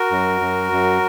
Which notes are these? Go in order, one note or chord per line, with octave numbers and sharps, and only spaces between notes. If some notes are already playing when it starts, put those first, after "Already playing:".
Already playing: F#4 A#4
F#2
F#2
F#2